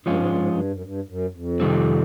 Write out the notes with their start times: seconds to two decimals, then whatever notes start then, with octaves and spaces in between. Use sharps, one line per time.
0.05 G2 F3 G#3 C#4 F4
0.16 G#2
0.27 G2
0.37 G#2
0.48 G2
0.71 F#2
0.82 G2
1.08 F#2
1.34 F2
1.60 C3 D#3 G3 C4